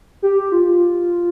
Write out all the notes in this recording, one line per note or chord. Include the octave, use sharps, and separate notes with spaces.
G4
F4